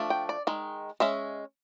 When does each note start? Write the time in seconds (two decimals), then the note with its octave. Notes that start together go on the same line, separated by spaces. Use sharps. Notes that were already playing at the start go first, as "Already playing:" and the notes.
Already playing: F3 A3 D4
0.10 G5
0.29 D5
0.47 D#3 G#3
1.00 G#3 C#4 E5